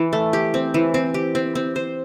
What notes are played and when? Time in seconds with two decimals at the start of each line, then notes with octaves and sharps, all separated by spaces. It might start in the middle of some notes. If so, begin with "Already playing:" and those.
Already playing: E3
0.13 A3
0.33 G4
0.54 C4
0.74 E3
0.94 C4
1.14 G4
1.35 C4
1.55 C4
1.76 C5